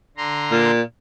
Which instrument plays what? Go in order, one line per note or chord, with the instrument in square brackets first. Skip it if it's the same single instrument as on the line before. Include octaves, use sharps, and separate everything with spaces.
[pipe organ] D3 A#5 C6
[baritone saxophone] A#2